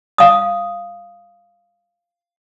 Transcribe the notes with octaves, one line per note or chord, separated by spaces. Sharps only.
F5 D#6